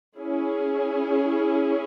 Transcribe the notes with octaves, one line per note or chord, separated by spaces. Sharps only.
C#4 E4 G#4